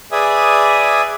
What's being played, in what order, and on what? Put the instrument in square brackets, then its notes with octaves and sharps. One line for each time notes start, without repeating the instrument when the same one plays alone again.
[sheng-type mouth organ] G#4 B4 D5 E5 G#5 D#6